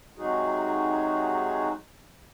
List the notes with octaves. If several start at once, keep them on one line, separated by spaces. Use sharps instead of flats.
C3 F#3 G#3 D#4 F#4 G#4